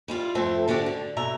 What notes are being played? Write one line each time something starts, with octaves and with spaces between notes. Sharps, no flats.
G3 E4 F4
F2 A3 C4 A4 C5 E5
D3 D4 F#4 G4 D5
D3
B2 E5 A#5